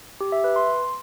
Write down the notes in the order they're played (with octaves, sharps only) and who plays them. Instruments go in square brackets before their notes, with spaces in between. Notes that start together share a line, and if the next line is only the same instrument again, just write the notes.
[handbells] G4
E5
B4
C6